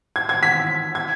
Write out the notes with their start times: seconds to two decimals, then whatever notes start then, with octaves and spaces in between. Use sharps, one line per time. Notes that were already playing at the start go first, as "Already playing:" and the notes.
0.16 G#6
0.29 G#6
0.43 B6
0.95 G#6